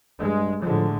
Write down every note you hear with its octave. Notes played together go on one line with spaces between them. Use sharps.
G2 G#3
A2 D3 F3 G#3